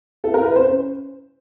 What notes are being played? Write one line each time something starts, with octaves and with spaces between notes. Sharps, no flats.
E4 A4
A#4
E4 B4
C5
C#4